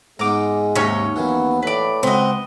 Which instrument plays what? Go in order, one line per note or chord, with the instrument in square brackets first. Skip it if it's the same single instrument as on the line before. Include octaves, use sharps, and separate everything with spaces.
[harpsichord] G#2 B3 D#4 [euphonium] G#3 [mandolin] A#5 D6
[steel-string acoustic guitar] D#2 [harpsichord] G#2 C3 [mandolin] C#4 D#4 C#5
[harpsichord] E3 F#3 A#3 [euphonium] B3
[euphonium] A2 [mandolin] B4 D5
[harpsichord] C#2 F#4 [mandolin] B3 D#5 [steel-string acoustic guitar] C4